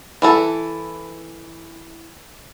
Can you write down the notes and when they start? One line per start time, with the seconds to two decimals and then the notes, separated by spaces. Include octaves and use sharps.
0.22 E3 E4 A4